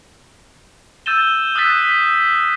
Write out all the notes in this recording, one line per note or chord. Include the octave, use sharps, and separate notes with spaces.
E6 G6 A6 D#7 E7 G7
D#6 E6 F#6 G6 A6 B6